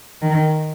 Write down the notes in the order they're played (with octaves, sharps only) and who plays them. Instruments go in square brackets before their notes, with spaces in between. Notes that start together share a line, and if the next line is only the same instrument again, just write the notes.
[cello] D#3